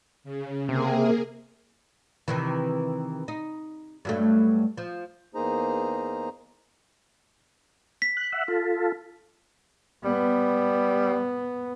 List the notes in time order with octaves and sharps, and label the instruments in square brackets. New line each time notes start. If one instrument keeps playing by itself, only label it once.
[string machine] C#3
[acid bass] C3 [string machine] A#3 G#4 A#4
[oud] C3 D#3 E3
D#4
G2 F#3 A3
F3
[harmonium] E2 A#3 D#4 G#4 C5 A#5
[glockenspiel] B6
[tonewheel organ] F#6
E5 F#5
F4 A4
[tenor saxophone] G3 [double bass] B3